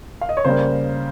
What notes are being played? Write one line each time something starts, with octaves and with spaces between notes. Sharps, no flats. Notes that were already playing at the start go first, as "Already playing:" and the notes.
F5
D#5
C#5
C#3 G3 A#3 C5